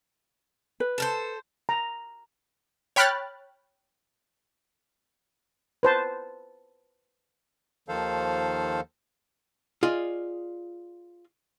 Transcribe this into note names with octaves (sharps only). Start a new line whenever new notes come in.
B4
A4 A#4 C5
A#5
C#5 G5 B5 F6 F#6 A6
B4 C5 A5
D#2 D#3 F3 A4 C5 F5
F4 G#4 D5 D#5